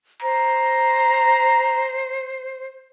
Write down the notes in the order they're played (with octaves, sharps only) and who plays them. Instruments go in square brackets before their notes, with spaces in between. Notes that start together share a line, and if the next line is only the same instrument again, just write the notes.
[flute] C5 [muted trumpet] A#5